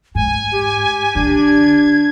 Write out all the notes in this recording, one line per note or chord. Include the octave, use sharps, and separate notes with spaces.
G#2 G#5
G4
D3 D4 G#6